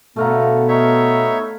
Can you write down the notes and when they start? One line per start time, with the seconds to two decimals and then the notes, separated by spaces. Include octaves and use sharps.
0.16 B2 D3 A3 B3 F5 A#5
0.68 D#4 C#5 E5